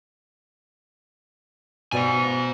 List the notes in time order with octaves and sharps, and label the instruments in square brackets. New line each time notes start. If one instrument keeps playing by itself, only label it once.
[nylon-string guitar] B2 D5 [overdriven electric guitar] C5 G#5